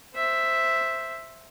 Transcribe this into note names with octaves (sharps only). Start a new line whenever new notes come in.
C5 E5